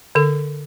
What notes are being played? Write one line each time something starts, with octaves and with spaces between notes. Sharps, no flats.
D3 A4